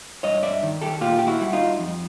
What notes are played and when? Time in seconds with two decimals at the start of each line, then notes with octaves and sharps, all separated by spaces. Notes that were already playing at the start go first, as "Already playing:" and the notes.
0.23 G2 C#5 D#5
0.43 D5 E5
0.63 D#3
0.81 G4 A4
1.01 A#2 F4 G4
1.19 G4
1.27 E4 F#4
1.41 G3
1.53 D#4 F4
1.79 F2